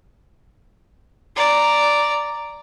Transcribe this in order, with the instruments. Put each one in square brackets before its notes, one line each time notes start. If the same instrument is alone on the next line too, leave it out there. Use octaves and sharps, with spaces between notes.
[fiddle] D5 A#5